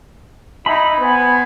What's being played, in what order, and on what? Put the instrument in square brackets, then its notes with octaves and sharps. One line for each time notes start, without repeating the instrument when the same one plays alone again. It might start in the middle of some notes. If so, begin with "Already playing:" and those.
[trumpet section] D#4 E4 [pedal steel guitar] B5
[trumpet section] B3 C5 G#5